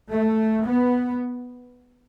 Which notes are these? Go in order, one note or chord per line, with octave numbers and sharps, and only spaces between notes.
A3
B3